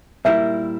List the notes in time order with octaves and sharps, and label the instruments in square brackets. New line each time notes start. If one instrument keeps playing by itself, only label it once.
[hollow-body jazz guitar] A#2 G3 A#3 E4 A#4 [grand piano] E5